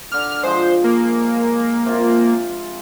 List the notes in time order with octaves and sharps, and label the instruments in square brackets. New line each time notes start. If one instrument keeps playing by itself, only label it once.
[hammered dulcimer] D3 D6 [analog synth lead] F6
[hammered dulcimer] F3 G#3 [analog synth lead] C5
[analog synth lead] A#3
[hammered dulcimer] C3 F4